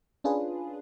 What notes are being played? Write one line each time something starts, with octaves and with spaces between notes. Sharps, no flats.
C#4 D4 F4 G#4 B4